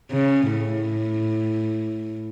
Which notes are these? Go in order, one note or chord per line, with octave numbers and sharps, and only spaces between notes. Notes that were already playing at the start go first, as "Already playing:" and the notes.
C#3
A2